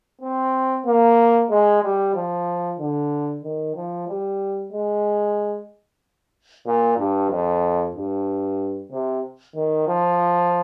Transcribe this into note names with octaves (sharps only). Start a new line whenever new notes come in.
C4
A#3
G#3
G3
F3
D3
D#3
F3
G3
G#3
A#2
G2
F2
G2
C3
D#3
F3